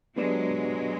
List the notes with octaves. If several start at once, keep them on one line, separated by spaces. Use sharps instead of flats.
F#3 G#3 B3 D4 G4 B4 D5